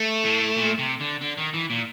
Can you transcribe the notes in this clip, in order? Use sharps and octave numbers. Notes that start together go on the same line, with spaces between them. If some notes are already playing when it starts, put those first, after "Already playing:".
Already playing: A3
A2
A#2
C3
D3
D3
D#3
E3
A#2